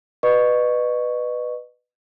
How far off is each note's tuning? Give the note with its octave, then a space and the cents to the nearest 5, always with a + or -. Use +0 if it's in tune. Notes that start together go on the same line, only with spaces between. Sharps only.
B4 +0 D#5 -35 C#6 +0